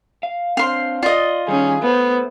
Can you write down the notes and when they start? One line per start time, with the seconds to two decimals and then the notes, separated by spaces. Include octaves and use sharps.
0.23 F5
0.57 C4 D4 C5 F5 C6
1.03 F4 D5 D#5
1.48 D#3 G3 C#4 D#4 G#4
1.82 A3 B3 C5